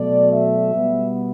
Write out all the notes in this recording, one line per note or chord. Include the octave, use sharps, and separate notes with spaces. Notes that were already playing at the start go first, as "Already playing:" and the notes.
Already playing: B2 F#3 A3 D5
E5
B2 G3 B3